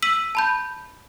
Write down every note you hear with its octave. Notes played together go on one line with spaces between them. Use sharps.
E6 B6 D#7 F#7
A5 B5 G6